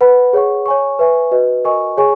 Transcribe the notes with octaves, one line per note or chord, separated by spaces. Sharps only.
B4 F#5 B5
G#4 C#5 F#5 C#6
C#5 G#5 C#6
B4 E5 G#5 C#6
F#4 B4 D#5
F#4 A#4 D#5 G#5 C#6
G#4 C#5 G#5 C#6